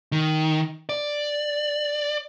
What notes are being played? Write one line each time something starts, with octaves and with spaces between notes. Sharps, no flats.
D#3
D5